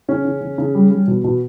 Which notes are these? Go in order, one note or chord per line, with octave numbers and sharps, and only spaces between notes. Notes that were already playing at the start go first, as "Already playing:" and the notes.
C#3 C#4
C#3
C#3
C#3
G3
G3
B2
B2